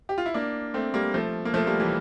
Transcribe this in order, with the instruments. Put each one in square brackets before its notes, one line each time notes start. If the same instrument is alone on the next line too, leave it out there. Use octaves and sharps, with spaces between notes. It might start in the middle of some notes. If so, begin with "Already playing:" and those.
[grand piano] G4
F4
E4
A#3 D4
A3 C4
G3 A#3
F3 A3
A#3
F3 A3
G3 A#3
E3 G3